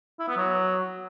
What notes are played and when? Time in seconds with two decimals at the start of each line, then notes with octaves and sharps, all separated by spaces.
0.19 E4
0.28 B3
0.37 F#3